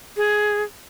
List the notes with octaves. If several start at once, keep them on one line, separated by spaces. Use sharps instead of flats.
G#4